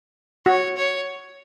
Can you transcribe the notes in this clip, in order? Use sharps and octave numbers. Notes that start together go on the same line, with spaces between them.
F#4 C#5
C#5